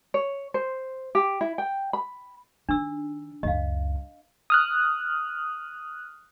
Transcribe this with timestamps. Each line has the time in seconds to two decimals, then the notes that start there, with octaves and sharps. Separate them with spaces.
0.14 C#5
0.54 C5
1.15 G4
1.41 E4
1.58 G5
1.93 B5
2.69 D#3 D4 E6
3.43 C#2 F#2 D#5 F5
4.50 D#6 F6 F#6